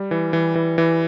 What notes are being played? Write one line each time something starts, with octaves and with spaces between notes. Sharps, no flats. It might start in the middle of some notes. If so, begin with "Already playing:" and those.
Already playing: G3
E3
E3
E3
E3